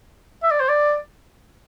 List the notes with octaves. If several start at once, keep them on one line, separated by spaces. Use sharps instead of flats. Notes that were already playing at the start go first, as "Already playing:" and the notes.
E5
D5
C5
D5